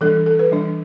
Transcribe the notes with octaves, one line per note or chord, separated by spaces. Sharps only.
E3 G3 D4 A4
A4
B4
E3 G3 D4